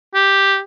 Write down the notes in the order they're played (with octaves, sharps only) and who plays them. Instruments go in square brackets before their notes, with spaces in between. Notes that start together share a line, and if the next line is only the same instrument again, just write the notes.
[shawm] G4